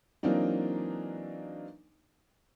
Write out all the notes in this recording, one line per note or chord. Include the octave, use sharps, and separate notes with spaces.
E3 F#3 A#3 C4 D4 D#4